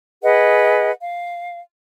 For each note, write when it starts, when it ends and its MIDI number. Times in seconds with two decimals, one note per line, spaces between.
0.23 0.91 68
0.23 0.91 71
0.23 0.91 75
0.23 0.91 78
1.01 1.61 77